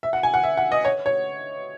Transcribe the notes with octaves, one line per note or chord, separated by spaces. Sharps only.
E5
F#5
G#5
F#5
E5
F#5
D#5
C#5
C#5